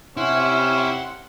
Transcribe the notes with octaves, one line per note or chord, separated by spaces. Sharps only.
C3 C#4 E4 F#5 C6